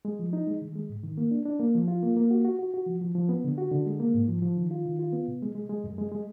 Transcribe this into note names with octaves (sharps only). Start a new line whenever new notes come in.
G#3
F3
D#4
G#3
D#3
G#3
G#2
D#3
A#3
D4
D4
A#3
F3
F4
A#3
A#3
F#4
F#4
F#4
F#4
F3
F3
F3
B3
D3
F#4
D3
G#3
A#3
G#2
F3
F3
D#3
F4
D#3
F4
B3
B2
G#3
G#3
G#3
F#2
G#3
G#3